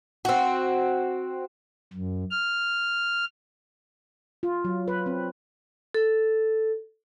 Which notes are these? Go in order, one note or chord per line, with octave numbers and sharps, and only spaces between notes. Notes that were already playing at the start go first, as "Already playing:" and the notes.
C4 F#4
F#2
F6
F4
F#3
B4
C4
A4